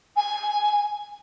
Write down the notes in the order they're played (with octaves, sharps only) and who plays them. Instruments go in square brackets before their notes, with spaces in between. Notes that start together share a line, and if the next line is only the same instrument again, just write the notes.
[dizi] G#5